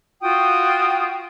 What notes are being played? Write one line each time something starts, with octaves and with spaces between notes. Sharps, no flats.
F4 F#4 G5 D#6